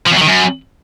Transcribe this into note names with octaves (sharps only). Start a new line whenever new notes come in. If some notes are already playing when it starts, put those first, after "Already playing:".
F3
E2
F#3
D#3
F#2